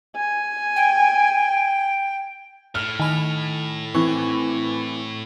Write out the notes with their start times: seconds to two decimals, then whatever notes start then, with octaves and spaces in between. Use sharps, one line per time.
0.16 G#5
0.76 G5
2.75 A2 F6
3.00 D#3 G#5 B5 F7
3.95 E3 C4 C#6